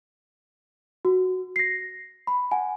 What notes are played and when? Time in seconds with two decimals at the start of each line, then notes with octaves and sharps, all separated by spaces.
1.05 F#4
1.56 A#6 C7
2.27 B5
2.51 F#5 G#5